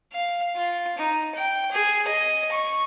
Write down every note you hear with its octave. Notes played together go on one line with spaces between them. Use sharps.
F5
F4
D#4
G5
G#4
D#5
C#6